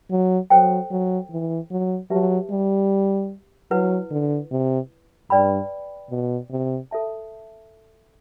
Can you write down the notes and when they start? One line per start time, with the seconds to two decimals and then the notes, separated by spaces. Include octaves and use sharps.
0.11 F#3
0.50 F#3 A4 C5 G5
0.91 F#3
1.31 E3
1.71 F#3
2.10 F#3 G4 B4 E5 A5
2.51 G3
3.71 F#3 E4 B4 F#5
4.11 D3
4.51 C3
5.30 G2 B4 D5 G5 B5
6.10 B2
6.50 C3
6.91 A4 E5 A5